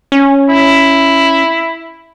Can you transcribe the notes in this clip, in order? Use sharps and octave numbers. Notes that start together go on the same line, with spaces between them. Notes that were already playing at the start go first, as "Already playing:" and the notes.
C#4
E4